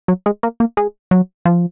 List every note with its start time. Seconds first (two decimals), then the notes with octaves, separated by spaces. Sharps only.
0.08 F#3
0.26 G#3
0.43 A#3
0.60 A#3
0.77 G#3
1.11 F#3
1.45 F3